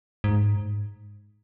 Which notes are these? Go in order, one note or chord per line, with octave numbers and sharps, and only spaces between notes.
G#2